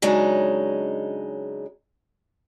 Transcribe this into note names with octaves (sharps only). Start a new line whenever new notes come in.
C#3 F#3 G#3 D4 D#4